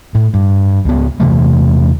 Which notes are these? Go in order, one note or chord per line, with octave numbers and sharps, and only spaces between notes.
A2
G2
C#2 B3
E2 C3 E3 A3